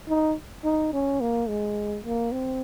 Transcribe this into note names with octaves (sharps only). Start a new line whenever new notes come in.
D#4
D#4
C#4
A#3
G#3
A#3
C4